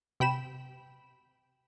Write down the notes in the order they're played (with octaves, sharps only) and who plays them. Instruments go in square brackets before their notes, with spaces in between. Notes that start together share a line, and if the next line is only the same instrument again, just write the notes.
[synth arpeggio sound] C3 G5 B5 E7